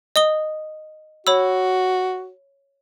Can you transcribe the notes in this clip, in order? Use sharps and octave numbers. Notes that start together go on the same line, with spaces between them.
D#5 D#6 G7
F#4 C#5 B5 E6